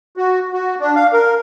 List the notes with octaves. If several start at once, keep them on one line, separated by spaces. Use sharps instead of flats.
F#4
F#4
D4
F5
A#4